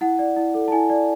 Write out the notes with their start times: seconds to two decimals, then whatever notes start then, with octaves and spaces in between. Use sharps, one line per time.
0.01 E4 F#5
0.19 D5
0.36 E4
0.54 A4
0.68 A5
0.72 E4 G#5
0.90 D5